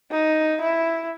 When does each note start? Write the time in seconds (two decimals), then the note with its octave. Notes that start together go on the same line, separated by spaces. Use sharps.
0.10 D#4
0.61 E4